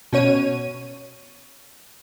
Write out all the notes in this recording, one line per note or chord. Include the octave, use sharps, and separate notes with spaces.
B2 C#4 C#5 D#7